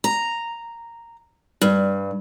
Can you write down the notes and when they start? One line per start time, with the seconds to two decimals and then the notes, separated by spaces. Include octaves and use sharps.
0.04 A#5
1.61 G2